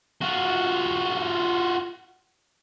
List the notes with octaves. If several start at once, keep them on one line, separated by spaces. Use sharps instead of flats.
F4 F#4